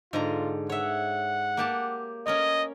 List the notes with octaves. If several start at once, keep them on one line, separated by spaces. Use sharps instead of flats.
G#2 D3 F4 A#5
C#5 E5 F#5
A#3 G4 A5
C#4 A#4 C#5 D#5